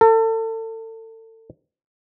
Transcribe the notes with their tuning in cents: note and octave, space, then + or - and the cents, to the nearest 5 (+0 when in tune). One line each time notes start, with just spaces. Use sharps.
A4 +30